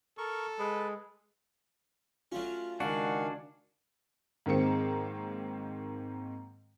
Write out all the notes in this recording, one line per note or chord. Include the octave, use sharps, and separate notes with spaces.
A4 A#4 C#6
G#3 B4
F#3 A3 C#4 F4
C#2 D#3 D4 F#4 F5 F#5 G#5 B5
G#2 D#3 A#3 C4 C#7